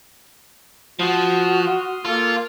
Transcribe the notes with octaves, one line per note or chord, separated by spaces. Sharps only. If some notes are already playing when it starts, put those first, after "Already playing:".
F3 F4 F#4 C6 D#6 F6
A#3 F4 A4